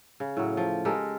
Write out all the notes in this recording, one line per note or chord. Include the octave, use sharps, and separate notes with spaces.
C#3
A2 F#3
F3
G#3 G4 A4 A#4